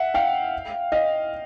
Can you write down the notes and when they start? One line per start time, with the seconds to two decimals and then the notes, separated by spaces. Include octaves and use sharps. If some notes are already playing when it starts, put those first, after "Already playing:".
Already playing: E5 F#5
0.14 F5 G5
0.92 D#5 F5